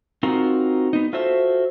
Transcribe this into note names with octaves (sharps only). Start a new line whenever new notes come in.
C4 D#4 F4 F#4 A#4
B3 D#4
F4 F#4 A4 C5 E5